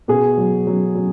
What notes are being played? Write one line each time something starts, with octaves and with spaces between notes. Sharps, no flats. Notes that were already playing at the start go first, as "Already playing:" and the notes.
B2 G#4
F#3
F#3
F#3